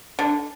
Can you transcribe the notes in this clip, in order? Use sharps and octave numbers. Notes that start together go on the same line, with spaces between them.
D3